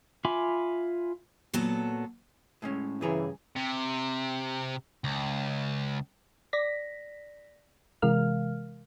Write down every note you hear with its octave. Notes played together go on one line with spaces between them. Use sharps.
F4 E5 G#5 B5 D6
A#2 F#3 B3 A4 C#5 A5
A2 G#3 C#4
G2 C#3 E3 G#4 A#5
C3
C#2
D5 A#6 B6
C3 E3 G#3 A#4 F5 F6